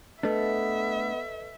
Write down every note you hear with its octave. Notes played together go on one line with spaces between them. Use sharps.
A3 B3 D4 A4 B4 D#5 E5